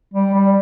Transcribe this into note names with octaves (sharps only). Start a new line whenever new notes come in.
G3
G3